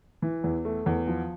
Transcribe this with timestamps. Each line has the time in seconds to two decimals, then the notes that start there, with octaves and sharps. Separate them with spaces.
0.22 E3
0.44 E2
0.65 A3
0.86 E2
1.08 F3